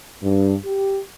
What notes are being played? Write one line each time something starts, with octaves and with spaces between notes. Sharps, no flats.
G2
G4